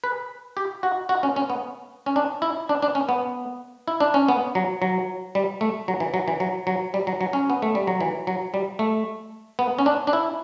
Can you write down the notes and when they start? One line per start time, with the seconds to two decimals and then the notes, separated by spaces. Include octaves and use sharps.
0.04 B4
0.57 G4
0.83 F#4
1.09 F#4
1.23 C#4
1.36 C#4
1.50 B3
2.06 C#4
2.16 D4
2.42 E4
2.69 D4
2.82 D4
2.95 C#4
3.09 B3
3.88 E4
4.00 D4
4.14 C#4
4.29 B3
4.55 F#3
4.82 F#3
5.35 G3
5.61 A3
5.88 F#3
6.00 E3
6.14 F#3
6.28 E3
6.40 F#3
6.67 F#3
6.94 G3
7.07 F#3
7.21 F#3
7.33 C#4
7.50 B3
7.62 A3
7.75 G3
7.87 F#3
8.01 E3
8.27 F#3
8.54 G3
8.79 A3
9.59 B3
9.79 C#4
9.86 D4
10.07 D4
10.13 E4